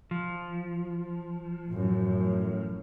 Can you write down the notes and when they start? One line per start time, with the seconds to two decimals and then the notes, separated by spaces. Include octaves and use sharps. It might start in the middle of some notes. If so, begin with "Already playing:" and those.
0.11 F3
1.69 F#2 A2